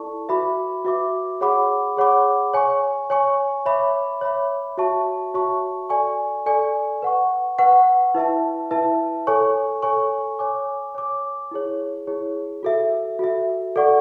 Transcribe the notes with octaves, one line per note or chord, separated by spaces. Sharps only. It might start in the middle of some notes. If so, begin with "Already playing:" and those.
Already playing: E4 A4 D5 A5 C#6
F#4 B4 E5 B5 D6
F#4 B4 E5 B5 D6
G#4 C#5 F#5 B5 D6
G#4 C#5 F#5 B5 D6
C#5 G#5 C#6
C#5 G#5 C#6
C#5 E5 B5 D6
C#5 E5 B5 D6
F#4 C#5 E5 A5 C#6
F#4 C#5 E5 A5 C#6
A4 D5 G#5 C#6
A4 D5 G#5 C#6
B4 F#5 C#6
B4 F#5 C#6
E4 B4 E5 A5
E4 B4 E5 A5
A4 C#5 G#5 C#6
A4 C#5 G#5 C#6
C#5 G#5 D6
C#5 G#5 D6
E4 G#4 C#5
E4 G#4 C#5
F#4 A4 E5
F#4 A4 E5
A4 D5 F#5 C#6